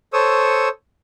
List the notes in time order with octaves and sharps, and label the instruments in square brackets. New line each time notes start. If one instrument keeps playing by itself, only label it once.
[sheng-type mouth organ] A4 C5 C#5 C#6 D#6 E6